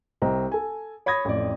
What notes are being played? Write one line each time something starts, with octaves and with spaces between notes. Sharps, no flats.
C2 C4 D#5 A#5
A4 G#5
C#5 B5 D#6 G#6 A#6
A1 F2 D5